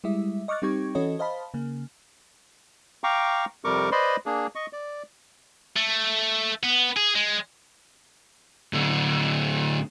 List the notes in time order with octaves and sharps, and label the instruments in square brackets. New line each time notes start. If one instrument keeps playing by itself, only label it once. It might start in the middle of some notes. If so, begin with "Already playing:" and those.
[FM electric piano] G3 G#3 E4 E5
D#5 C#6 D6 F6 F#6 A6
G3 C4 D#4 G4 C#6 G#6
E3 C#4 F#4 A4 C#5 D#5
C5 D#5 F5 A5 B5
C#3 A#3
[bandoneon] F5 G5 A#5 C#6 D6
F2 C3 G3 A#4 C#6 D6
B4 C5 D5 D#5 B5 C6
A#3 D4 G#4
D#5 C#6
D5
[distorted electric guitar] A3
B3
G#4
G#3
[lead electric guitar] A2 D3